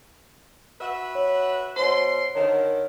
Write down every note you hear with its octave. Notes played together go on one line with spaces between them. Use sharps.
F#4 B4 E5
C#5
B2 C5 C#5 C6
D3 D#3 C#5